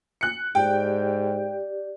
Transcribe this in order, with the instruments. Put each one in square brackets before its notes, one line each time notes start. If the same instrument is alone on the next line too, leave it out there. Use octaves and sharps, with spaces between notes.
[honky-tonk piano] F#6 C#7
[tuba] G#2 [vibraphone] G4 D5 [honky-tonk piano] G5